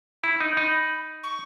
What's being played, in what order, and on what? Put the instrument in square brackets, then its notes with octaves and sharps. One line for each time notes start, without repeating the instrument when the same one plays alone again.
[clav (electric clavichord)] E4 [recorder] B5
[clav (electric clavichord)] D#4
D#4
[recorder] C#6